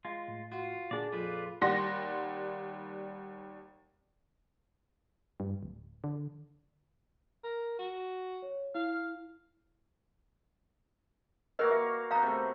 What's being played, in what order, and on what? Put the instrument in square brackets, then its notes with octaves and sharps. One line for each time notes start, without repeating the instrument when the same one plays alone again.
[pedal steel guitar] G#3 F4
[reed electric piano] A2
[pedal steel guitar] F4 [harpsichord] F#4
[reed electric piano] A#2 G#4 [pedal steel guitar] D3 D4 D5
[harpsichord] F2 [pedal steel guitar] F4 B4 D5
[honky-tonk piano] D#2 G3 F#5 C6 A#6
[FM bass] G2
D1
D3
[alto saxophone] A#4
F#4
[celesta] C#5
[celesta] E4 [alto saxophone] F5
[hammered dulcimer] A#3 F#4 F5 [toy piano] A#4 B4 D#5
[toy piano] E5 [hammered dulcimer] C#6
[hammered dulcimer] B3 D#4 [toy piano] F5 A#5
[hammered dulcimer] C3 A3